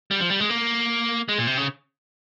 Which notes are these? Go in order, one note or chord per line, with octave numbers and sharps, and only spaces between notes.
G3
F3
G3
G#3
A#3
G#3
A#2
C3
C#3